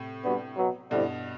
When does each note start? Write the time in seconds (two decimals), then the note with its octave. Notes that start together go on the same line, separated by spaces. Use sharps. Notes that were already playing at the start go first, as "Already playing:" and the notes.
Already playing: A2 C3
0.23 G3 B3 D4 F#4
0.57 B2 F#3 B3
0.91 G2 B2 D3 G3 C4 E4